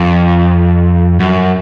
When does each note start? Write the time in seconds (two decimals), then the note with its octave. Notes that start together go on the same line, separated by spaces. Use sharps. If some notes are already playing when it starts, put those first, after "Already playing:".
Already playing: F2
1.20 F#2